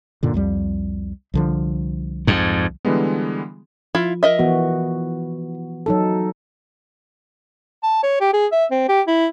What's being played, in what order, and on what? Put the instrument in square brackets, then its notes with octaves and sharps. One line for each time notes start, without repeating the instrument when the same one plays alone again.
[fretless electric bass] F#2 A#2 D3
C2 F2 G3
C2 D3 F3
[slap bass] F2 G#2
[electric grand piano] D3 E3 G3 G#3 B3
[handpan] F3 [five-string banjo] E4 F4
[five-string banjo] A#4 D#5 E5
[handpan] E3 B3 F#4
F#3 D#4 A4
[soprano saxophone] A5
C#5
G4
G#4
E5
C4
G4
E4